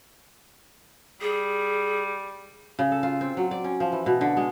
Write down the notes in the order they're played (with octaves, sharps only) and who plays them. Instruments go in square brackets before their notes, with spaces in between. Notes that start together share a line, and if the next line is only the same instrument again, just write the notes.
[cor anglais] G3 [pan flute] G#4
[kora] C#3
A4
F4
C4
F#3
D5
C#4
F3
E3
B2
D3
G#3